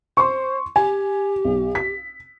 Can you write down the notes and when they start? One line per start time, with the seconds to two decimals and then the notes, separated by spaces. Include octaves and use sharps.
0.17 C5 C6 C#6
0.76 G4 G#5
1.45 B1
1.75 B6